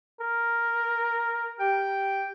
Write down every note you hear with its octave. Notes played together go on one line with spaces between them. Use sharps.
A#4
G4 G5